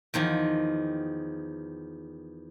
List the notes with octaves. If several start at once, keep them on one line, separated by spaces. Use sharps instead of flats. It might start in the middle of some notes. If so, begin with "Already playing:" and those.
E2 D#3 F3